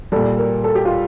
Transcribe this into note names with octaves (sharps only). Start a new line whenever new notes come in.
A#2 G3 A4
A#4
A4
G4
F4